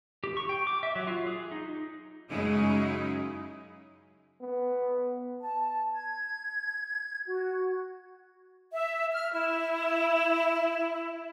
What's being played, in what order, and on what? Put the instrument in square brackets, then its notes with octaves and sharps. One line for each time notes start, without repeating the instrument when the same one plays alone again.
[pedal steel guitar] G4
C#6
G5
D6
E5
F#3
F4
G#4
D#4
[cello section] F#2 C#3 G#3 D#4 E4 G#4
[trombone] B3
[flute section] A5
G#6
F#4
E5
F6
E4